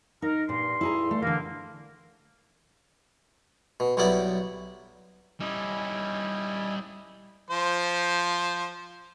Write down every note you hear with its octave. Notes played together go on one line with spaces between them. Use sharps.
D#4 A#4
G2 A#2 C6
E4 G#4 A#5
A3
D3 E3 A#3
B2
B1 F#3 G3 B3 E4 D5
G3 C#4 E4 D#5 G#5
F3 C5